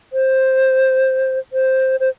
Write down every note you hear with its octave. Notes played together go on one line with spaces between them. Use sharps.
C5
C5
C5